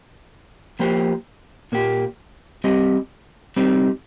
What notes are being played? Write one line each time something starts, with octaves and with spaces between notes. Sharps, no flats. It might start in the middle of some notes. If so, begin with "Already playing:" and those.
F3 A#3 G4 C5
A#2 A#3 G4
G3 C4 G4 D#5
G3 C4 D#4